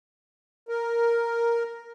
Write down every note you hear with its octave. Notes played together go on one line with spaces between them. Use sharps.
A#4